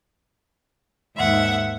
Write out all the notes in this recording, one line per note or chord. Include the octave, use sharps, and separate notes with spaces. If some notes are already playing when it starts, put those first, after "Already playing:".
D#2 G#2 E5 F#5